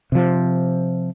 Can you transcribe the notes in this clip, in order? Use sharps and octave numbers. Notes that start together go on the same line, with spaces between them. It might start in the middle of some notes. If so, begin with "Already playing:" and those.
C3 F3